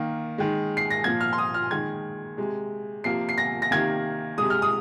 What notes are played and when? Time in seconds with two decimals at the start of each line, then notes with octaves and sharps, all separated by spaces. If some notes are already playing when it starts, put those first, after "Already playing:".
Already playing: D#3 A#3
0.38 D#3 G#3
0.77 C7
0.91 A#6
1.04 A#2 F3 A#3 G#6
1.21 F6
1.33 C6
1.38 D#6
1.54 F6
1.71 D#3 G#3 G#6
2.37 C3 G#3
3.04 C3 F3 A#3 C7
3.29 C7
3.38 A#6
3.62 A#6
3.71 C3 D#3 A#3 G#6
4.38 C3 G#3 D#6
4.50 F6
4.62 D#6